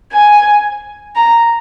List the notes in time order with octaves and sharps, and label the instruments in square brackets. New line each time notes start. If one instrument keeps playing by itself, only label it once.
[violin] G#5
A#5